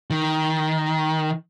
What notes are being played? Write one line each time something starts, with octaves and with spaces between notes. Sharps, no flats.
D#3